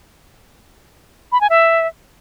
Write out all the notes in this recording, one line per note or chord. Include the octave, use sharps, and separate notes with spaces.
B5
G#5
E5